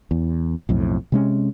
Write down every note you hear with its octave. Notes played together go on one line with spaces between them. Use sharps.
E2
B1 F2 A2
C3 G#3 C#4